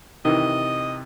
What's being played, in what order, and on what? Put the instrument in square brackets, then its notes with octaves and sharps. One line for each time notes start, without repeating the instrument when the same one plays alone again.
[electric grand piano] C3 [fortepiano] D#3 E3 [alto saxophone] D#5